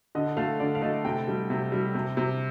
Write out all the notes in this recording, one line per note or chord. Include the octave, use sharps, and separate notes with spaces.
D3 D#5
A3 F5
D3 D5
F5
A3 D#5
C3 G5
G3
C3
G3
C3
C3